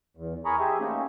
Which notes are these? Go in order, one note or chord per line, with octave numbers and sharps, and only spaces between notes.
E2
A#4 G#5 A#5 B5 C#6 D#6
G4 G#4 C5 D#5 E5
A3 A#3 C#4 D#4